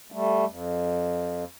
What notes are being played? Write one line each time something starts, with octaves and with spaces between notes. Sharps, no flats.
G3 A3
F2